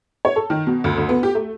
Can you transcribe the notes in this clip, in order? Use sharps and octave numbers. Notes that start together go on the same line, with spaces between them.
C#5
A4
D#3
B2
D2
D2
B3
G4
A3